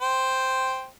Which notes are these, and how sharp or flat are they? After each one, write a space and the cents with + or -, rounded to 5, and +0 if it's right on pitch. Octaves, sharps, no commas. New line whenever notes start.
C5 +0 G5 +0